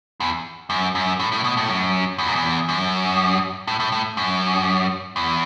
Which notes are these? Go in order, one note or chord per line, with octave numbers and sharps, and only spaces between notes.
E2
F#2
F#2
A2
A2
B2
A2
F#2
E2
F#2
E2
F#2
A2
A2
A2
F#2
E2